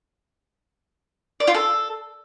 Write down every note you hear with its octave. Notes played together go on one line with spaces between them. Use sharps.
D5
F4
A4